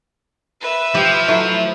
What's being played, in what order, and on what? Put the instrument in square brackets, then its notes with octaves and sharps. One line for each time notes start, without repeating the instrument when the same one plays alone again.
[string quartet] B4 E5
[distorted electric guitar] F3 [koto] G4 G5
[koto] F#3 A3 E4